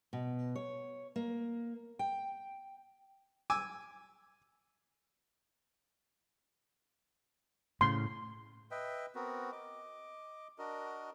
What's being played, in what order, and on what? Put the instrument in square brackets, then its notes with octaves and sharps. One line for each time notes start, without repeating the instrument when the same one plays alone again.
[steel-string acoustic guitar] B2
C#5
A#3
G5
[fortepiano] G#5 D6 E6
[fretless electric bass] A2 C#3 [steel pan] C6
[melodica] B4 D#5 E5 G5
B3 C4 F#4 A#4
D#5 D6
D4 F#4 A#4 D#5